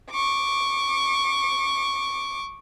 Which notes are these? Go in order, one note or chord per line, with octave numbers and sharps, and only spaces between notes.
C#6 D6